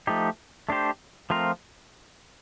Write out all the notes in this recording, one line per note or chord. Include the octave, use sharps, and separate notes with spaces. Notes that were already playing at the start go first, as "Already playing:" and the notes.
F3 A3 D#4 G4
A3 D4 G4 C5
F3 A3 C4 F4 A#4